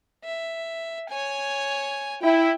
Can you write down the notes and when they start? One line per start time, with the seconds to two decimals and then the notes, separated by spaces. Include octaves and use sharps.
0.24 E5
1.09 C#5 G#5
2.22 E4 G5